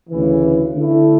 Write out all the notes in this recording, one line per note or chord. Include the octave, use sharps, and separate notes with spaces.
D2 C#3 E3
D3 A3 E4